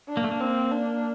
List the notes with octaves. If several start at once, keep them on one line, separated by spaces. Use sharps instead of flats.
D4
A#3
A3
A#3
C4
D4